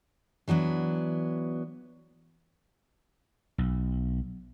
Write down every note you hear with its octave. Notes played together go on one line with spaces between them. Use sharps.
E3 F#3 B3 D4
B1